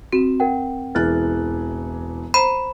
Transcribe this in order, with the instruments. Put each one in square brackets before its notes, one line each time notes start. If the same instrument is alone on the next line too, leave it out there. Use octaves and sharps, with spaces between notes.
[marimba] C4 [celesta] F#4 E7
[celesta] A#4 F#5 G5
[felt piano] E1 E3 F#6 [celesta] F6 A6
[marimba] C5 A#5 [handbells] B5 [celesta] D#7